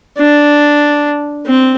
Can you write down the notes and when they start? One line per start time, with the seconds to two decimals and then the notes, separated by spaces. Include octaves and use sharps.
0.18 D4
1.47 C4